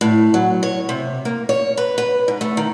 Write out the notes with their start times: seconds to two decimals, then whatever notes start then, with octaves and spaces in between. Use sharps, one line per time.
0.01 A2
0.34 F#3
0.63 C#5
0.89 C3
1.25 A#3
1.49 C#5
1.77 B4
1.98 B4
2.28 G#2
2.41 A3
2.57 D#3